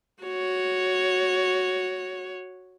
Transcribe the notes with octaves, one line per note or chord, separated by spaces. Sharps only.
F#4 C#5